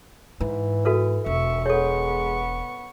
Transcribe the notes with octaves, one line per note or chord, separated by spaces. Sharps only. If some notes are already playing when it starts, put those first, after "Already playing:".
G#2 E3
F#4 A4 B4
E1 E5 C#6
G#3 B3 A4 C#5 C#6